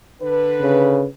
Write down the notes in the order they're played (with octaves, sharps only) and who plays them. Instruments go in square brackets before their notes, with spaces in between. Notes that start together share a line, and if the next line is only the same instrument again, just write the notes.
[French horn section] D3 B4
[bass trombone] C#3